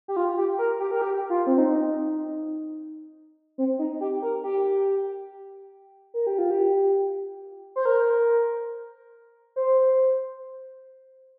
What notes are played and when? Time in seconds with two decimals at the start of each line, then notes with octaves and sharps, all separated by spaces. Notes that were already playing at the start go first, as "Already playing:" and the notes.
0.08 G4
0.16 F4
0.37 G4
0.59 A#4
0.80 G4
0.91 A#4
1.02 G4
1.30 F4
1.47 C4
1.58 D#4
3.58 C4
3.79 D#4
4.01 G4
4.22 A#4
4.44 G4
6.14 A#4
6.27 G4
6.39 F4
6.51 G4
7.76 C5
7.85 A#4
9.56 C5